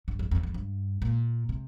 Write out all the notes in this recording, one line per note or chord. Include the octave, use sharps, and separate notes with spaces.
G2
F2
F2
F2
G2
A#2
C3